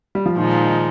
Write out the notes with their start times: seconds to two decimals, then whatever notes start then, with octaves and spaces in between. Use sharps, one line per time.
0.15 G3
0.26 F3
0.37 A#2 D#3 F3 G#3 D#4
0.69 D#3